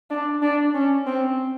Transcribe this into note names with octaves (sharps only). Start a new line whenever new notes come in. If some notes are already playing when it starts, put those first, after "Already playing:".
D4
D4
C#4
C4